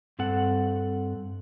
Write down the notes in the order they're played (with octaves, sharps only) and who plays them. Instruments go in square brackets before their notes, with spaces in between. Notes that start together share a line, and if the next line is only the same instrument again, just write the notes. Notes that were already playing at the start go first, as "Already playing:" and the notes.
[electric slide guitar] G2 C4 A4 F#5